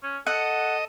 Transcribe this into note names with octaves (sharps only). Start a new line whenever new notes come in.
C#4
A4 D#5 F#5